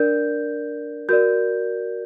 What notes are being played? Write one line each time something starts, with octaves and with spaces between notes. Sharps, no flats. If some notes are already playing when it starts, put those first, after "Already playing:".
Already playing: D4 A#4 D5 G6
F#4 A#4 D5 G6